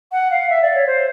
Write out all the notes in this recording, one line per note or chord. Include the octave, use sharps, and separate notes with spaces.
F#5
F5
E5
D5
C#5
C5